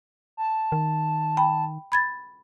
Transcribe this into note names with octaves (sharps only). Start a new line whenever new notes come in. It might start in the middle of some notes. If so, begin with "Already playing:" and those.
A5
D#3
G5 B5
B5 G#6 A6